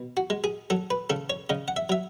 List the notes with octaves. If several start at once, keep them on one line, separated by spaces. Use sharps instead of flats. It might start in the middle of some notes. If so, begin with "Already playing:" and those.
Already playing: B2
F#4
G#3
G#4
F#3 A4
B4
C#3 A4
C#5
C#3 D#5
F#5
E5
F#3 E5